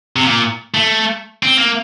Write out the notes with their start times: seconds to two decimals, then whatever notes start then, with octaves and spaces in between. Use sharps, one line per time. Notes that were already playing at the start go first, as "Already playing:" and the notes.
0.16 C3
0.26 A#2
0.74 A3
1.43 C4
1.57 A#3